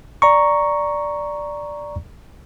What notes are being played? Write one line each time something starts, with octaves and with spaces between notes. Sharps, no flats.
D5 A#5 C#6